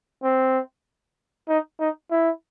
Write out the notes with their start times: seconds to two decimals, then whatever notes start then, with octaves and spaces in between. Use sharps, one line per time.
0.23 C4
1.49 D#4
1.80 D#4
2.11 E4